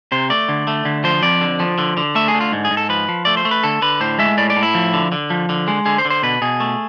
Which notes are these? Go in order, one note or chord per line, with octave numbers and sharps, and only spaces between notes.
C3 C5
A3 D5
D3
A3
D3
F3 C5
F2 D5
D3
F3
D3
D3
A3 E5
G#4
D3
F4
G#2
G#4
G#2
A4
F3 B4
F3
A3 D5
C5
A3
B4
D3 A4
D3 B4
A2 C5
G#3 E5
A2 D5
D5
A2
E4
F3
D3
D3
F3
D3
G#3
D3 G#4
C5
D3
C5
B2 B4
B2 G#4
A3